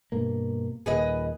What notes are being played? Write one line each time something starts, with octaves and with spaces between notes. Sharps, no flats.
G2 B2 A#3
D#1 A#2 G#4 B4 D#5